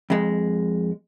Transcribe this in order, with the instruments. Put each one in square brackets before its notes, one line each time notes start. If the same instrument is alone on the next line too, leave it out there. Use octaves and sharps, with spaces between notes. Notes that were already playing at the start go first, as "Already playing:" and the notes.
[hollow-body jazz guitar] F2 G#3